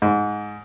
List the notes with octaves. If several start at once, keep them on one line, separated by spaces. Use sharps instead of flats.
G#2